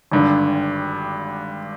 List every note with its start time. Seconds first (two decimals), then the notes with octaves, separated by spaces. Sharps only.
0.12 G#1 G2 D3